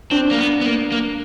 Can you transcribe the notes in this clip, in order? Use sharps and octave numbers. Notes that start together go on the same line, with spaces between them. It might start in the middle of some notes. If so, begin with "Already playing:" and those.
C4 D4
A#3
B3
B3
A#3
A#3